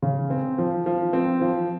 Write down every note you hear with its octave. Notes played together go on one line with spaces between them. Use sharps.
C#3
C4
F3
F3
C4
F3